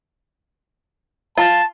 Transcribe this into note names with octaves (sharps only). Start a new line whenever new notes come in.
F4 A5